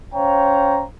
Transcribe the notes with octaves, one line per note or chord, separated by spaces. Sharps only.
C#4 C5 C#5 F5 G5 A#5